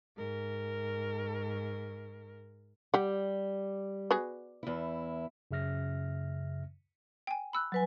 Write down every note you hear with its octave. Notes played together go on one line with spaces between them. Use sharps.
G#2 A#4
G3 G4 F#5
B3 F#4 G#4
E2 E4
F#2 C#3 E5 F6 A#6
G5 G#5
B5 E6 F#6
F#3 B4 G#5